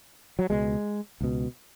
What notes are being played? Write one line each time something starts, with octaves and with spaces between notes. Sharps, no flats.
F#3
C#2 B2 G#3
C#2 B2